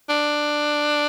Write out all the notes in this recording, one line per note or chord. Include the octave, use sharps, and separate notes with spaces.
D4